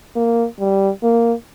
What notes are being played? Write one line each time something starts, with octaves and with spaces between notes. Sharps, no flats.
A#3
G3
A#3